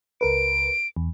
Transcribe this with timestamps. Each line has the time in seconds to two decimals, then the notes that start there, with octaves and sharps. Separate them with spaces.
0.21 C#2 A#4 B4 D7
0.96 E2